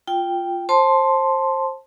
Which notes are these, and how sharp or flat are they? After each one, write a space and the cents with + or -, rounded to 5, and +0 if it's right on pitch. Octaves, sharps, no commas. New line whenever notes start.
F4 +0 G5 +0
C5 +25 A5 +0 C6 +0